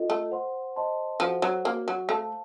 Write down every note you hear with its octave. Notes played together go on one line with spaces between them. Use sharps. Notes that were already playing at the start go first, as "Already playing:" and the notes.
Already playing: F4 A4 D#5
A3
C5 F#5 C6
C5 D#5 A5 C6
F3 F#4 A4 C5 F#5
F#3
A#3 F#4 A#4 C#5
F#3
A3 A4 C5 F5 A5